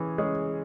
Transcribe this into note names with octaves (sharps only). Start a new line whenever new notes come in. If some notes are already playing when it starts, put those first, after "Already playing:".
Already playing: E3 C#4 G#4
G#3 C#4 G#4